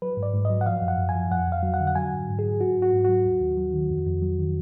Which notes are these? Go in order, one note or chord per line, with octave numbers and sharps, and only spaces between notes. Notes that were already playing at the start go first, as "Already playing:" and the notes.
F#3 B4
G#2
D5
G#2
F#3 D#5
F#5
F3 F5
F#2
F#5
F#2
G#5
F3
F2 F#5
F2 F5
F#3
F#5
D3
F#5
F#3 G#5
G#2
G#2
G#4
F#3
F#3 F#4
G#2
F#4
G#2
F#3 F#4
D#2
D#2
F#3
D#3
F2
F2
F#3
D#3